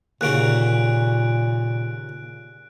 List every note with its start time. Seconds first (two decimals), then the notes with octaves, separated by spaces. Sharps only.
0.21 D#2 A#2 C#3 F#4 F#6 D7